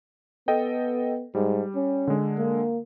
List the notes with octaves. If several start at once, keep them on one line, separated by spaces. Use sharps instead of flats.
B3 A4 D#5 G5
G#2 G3
C#4
D3 G#3
A#3